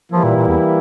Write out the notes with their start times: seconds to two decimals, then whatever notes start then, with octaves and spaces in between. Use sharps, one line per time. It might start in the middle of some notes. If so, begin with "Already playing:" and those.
0.12 E3 F3 G3 A#3 E4
0.24 A#2
0.36 A#2
0.48 E2